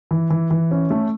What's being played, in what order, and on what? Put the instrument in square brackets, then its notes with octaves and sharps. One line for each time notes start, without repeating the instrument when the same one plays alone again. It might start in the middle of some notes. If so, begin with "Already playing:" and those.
[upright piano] E3
E3
E3
C#4
A3